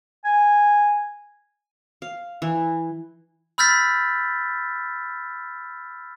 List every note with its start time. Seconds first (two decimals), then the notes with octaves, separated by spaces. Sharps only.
0.25 G#5
2.02 F5
2.42 E3
3.58 B5 E6 F6 G6 A6 B6